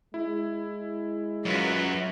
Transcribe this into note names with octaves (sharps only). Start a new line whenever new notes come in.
G#3 E4
F#2 F4 F#4 B4